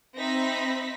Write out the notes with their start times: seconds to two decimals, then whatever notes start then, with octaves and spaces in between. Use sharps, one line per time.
0.15 C4 D#4 E5 B5 A#6 B6